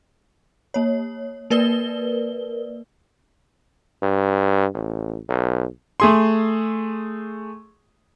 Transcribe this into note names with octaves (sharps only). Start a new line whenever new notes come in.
A#3 C#5
A#3 A#4 B4 D5 G7
G2
A1
B1
A3 G#4 C6